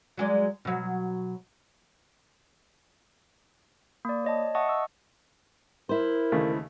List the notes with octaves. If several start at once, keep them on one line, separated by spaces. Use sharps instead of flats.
F#3 G#3 D5
B2 F#3
A#3 D5
C#5 D#5 A5
D#5 E5 F#5 A5 C#6 D#6
C#6 E6
E4 A#4 C5
D#2 C#3 A3